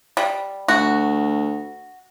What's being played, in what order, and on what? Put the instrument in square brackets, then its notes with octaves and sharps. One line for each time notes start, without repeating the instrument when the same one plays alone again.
[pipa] G3
[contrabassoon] D2 [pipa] F#4